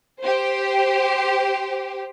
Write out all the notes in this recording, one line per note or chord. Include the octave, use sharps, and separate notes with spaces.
G4 C5